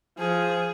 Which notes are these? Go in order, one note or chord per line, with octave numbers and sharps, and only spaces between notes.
F3 G#4